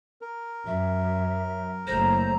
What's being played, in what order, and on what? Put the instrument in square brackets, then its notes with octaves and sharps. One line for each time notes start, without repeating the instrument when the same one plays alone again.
[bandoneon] A#4
[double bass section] F#2 [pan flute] E5
[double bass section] F#1 A3 [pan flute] C5 [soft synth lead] A#5